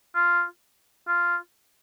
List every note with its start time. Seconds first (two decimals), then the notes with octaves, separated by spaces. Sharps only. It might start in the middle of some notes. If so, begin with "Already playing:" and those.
0.15 F4
1.08 F4